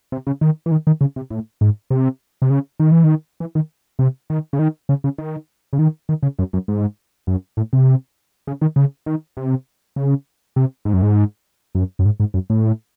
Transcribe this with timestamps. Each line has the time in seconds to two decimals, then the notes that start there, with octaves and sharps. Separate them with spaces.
0.12 C3
0.27 C#3
0.41 D#3
0.66 E3
0.72 D#3
0.87 D#3
1.01 C#3
1.16 C3
1.31 A2
1.61 G#2
1.90 C3
2.42 C3
2.50 C#3
2.80 D#3
2.92 E3
3.04 D#3
3.40 E3
3.55 D#3
3.99 C3
4.30 D#3
4.53 C#3
4.59 D#3
4.89 C#3
5.04 C#3
5.18 D#3
5.73 C#3
5.79 D#3
6.09 D#3
6.23 C#3
6.39 F#2
6.53 F#2
6.68 G#2
7.27 F#2
7.57 A2
7.73 C3
8.47 C#3
8.62 D#3
8.76 C#3
9.06 D#3
9.37 C3
9.96 C#3
10.56 C3
10.85 G#2
10.93 F#2
11.02 G#2
11.75 F#2
11.99 F#2
12.05 G#2
12.20 G#2
12.34 F#2
12.50 A2